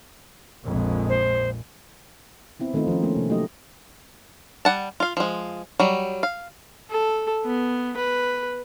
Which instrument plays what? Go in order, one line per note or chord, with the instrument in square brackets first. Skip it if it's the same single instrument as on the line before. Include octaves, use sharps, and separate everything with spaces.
[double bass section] A#1 F2 G#3
[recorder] C5
[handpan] B3 C4 E4
D#3 A3 C4 D#4 F4
F3 C#4
A3 A#3 C#4
C3 A3
F#3 A3 A#3 D#4 G4 D#5
[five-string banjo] G3 F#5 A5
F4 F5
F3 G#3
F#3 G3
F5
[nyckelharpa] A4
B3
B4